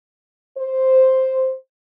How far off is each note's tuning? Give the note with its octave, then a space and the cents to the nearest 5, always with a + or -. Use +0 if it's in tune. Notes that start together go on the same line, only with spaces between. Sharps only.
C5 +0